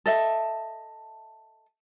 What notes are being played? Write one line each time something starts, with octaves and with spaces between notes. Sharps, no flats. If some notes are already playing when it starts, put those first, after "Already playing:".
A4 D#5 E5